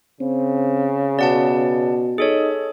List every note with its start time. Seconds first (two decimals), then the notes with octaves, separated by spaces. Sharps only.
0.21 C#3 C4
1.19 B2 D5 F#5 A5
2.18 D#4 G#4 A4 C#5